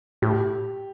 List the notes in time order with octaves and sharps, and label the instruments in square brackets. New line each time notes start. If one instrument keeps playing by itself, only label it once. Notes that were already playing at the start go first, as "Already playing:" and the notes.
[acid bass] A2 [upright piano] G4